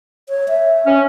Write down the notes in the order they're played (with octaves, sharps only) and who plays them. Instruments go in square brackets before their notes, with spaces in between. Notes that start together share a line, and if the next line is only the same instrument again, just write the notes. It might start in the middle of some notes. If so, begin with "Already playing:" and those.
[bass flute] C#5
E5
[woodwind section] C#4